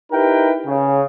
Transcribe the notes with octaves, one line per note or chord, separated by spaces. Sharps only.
D#4 E4 G4 A#4 B4 G5
C#3